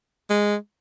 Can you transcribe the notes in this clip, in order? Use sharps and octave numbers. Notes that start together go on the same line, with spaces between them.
G#3